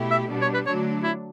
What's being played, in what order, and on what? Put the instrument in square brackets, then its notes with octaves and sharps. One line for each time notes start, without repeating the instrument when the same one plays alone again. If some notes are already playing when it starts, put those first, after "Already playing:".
Already playing: [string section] B2 A3 E4 G4
[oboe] E5
[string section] B2 G3 B3 D4
[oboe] C#5
B4
[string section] D3 F#3 A3 D4 [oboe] C#5
[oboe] E4